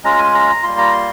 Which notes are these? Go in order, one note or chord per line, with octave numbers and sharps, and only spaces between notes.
G#3 C#4 F4 A#5
G#5
A#5
G3 A#3 F4 C6
A#5
C6